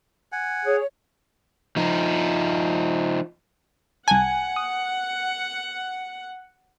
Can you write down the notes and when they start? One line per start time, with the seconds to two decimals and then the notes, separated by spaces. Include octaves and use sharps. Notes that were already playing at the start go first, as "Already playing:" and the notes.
0.32 F#5 G#5
0.65 G#4 C#5
1.76 F3 D#4
4.08 C2 F#5 G#5 A5
4.56 D#6